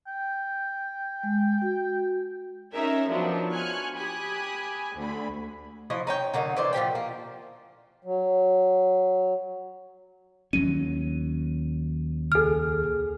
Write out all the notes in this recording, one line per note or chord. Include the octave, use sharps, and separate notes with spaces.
G5
G#3
F#4
C#4 D#4 G#4 A#4 E5
F3 F#3 B3 D4 D#4
G#5 C#6 F6 F#6
G4 G#5 B5 D#6 F#6
D2 D3 B5
F3 F#3 E4 D#5
D#4 C#5 G5
D3 F#3 A#3 D#4
E3 C5 D5
A#2 F3 G4 G5
A#3
F#3
D#2 F#3 C#4 D#7
C#2 G#4 A4 F6